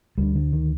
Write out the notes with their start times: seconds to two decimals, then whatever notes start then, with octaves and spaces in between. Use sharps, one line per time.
0.18 D2 D3 G3
0.35 D3
0.53 D#3